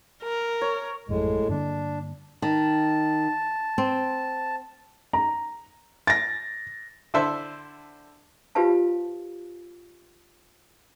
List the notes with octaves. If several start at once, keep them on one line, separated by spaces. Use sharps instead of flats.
A#4
C#5
G#1 F2 A2 F#3 G#3
G2 D3 A#3 D4
D#3 A5
C4
A#5
A6 A#6
D3 E4 A4 C5 E5 E6
F4 G4 B4 C5 F5 A5